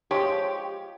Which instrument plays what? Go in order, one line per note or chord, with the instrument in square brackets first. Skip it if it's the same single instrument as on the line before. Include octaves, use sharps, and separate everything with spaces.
[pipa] F3 G#3 [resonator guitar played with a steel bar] G4 [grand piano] C#5